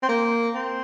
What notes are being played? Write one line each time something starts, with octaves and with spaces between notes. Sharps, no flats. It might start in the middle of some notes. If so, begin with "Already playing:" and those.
C4
A#3
C4